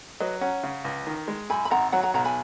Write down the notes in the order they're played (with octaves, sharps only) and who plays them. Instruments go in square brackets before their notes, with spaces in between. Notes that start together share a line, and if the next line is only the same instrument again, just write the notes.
[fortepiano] F#3 [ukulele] B4 D#5
[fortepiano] C#4 [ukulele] F#5 A#5
[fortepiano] C#3
C#2
D#3
G#3
[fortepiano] F#2 [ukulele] G#5 B5
[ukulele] B5
[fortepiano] G#1 [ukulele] F#5 A#5
[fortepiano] F#3 [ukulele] F#5 A#5
[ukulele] F#5 A#5
[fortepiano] B1 [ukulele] F#5 A#5
[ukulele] G#5 B5